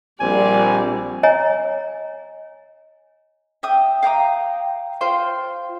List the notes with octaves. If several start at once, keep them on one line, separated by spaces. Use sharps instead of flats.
A#1 G3 C4 D5 G#5
C#5 D#5 G#5 A#5
E5 G5 D#6
F5 G5 A#5 D#6
F4 C5 G5 C6